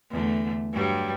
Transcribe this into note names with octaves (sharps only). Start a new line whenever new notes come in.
E2 D3 A3
G2 F#3 G3